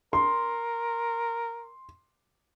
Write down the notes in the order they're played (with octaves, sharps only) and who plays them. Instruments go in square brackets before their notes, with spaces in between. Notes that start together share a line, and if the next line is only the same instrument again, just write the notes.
[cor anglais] A#4 [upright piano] C6